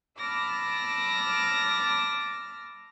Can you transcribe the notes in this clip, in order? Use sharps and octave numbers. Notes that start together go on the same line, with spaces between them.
A5 B5 D6 E6 F6 A#6